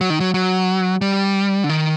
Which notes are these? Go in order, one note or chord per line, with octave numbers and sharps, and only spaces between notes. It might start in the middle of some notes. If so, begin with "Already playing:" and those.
F#3
D#3
F#3
F#3
G3
D3
D#3